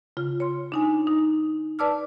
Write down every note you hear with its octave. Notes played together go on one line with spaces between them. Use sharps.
C#3 F4
C#5 C6
D4 D#4 G#5
D#4
B4 D5 A5 D6 E6 F6